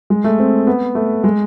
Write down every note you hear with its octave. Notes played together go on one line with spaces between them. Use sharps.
G#3
A3
C4
B3
A3
G#3